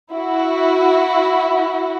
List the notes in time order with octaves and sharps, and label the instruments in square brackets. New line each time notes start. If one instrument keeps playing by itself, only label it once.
[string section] E4 F#4